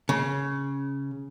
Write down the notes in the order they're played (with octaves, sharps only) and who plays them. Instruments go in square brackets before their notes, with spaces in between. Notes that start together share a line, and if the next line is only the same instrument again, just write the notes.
[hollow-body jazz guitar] C#3